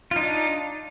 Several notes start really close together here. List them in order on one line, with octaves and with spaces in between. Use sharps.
F4 D#4 D4